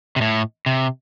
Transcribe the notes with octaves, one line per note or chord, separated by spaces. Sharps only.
C3
A2
C3